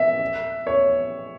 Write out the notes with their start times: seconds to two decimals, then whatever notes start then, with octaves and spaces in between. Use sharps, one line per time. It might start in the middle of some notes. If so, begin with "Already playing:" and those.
Already playing: E5
0.67 C#5